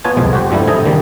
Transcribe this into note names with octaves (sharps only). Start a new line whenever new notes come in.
B3 F4 B4 C#5 G#5 A5
C2 F2 F3 G#3
F#4 G4 C5
G2 F3 G3 A3 E4
C4 D#4 A4 D#5 G#5
D3 D#3 G3 A#3